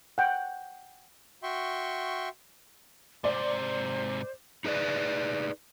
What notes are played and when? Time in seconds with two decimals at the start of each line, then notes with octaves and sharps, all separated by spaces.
0.18 F#5 G5
1.43 F#4 E5 G5 C6 C#6
3.24 G#2 C3 C5 D5
4.65 D#4 G#4 B4 D5